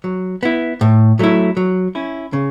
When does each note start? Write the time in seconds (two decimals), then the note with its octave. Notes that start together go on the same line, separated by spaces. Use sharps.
0.04 F#3
0.43 B3 E4
0.81 A2
1.19 F#3 A3 E4
1.57 F#3
1.95 C#4 E4
2.33 C#3